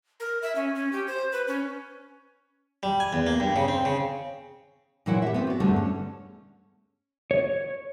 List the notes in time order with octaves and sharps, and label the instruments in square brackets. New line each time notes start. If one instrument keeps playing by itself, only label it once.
[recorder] A#4
E5
C#4
C#4
G4
C5
B4
C#4
[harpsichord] G3
G#5
E2
A#3
G2
C#3
C4
C#3
[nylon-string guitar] A#2 E3 F#3 E4 F#5
G4 E5
B3 C4
F#4 D5
E2 G2 D3 G3 A3
C#4
[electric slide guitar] C#5